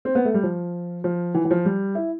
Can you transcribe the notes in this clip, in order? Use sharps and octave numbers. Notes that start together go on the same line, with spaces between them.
C4
B3
A3
G3
F3
F3
E3
E3
F3
G3
E4